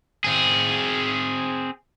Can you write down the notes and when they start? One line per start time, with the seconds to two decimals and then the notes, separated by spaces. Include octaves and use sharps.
0.24 C4 G#4